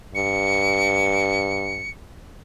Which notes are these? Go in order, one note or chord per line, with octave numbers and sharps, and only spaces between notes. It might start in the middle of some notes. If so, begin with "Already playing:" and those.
G2 C#7